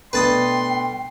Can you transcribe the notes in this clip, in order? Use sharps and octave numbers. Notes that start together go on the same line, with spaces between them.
B2 A3 D4 B4 G5 A5 C6 D#6